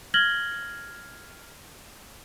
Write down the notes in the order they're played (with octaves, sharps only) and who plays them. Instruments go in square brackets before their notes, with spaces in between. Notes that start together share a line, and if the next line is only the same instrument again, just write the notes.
[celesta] F6 G#6 A#6 F#7 G7